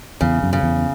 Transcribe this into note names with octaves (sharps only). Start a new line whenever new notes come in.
E2 C#3
F#2
C#3
E2